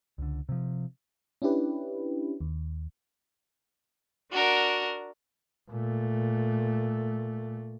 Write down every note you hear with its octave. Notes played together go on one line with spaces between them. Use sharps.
C#2 D3
C3 F3
C#4 D4 E4 G4 B4
D#2
D4 F#4 A#4
A#2 A3